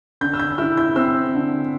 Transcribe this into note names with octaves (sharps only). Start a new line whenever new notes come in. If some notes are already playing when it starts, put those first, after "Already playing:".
D3 G6
E6
G6
E4 E6
G6
C4 E6
D3